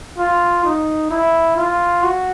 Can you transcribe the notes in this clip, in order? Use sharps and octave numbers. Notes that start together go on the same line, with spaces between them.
F4
D#4
E4
F4
F#4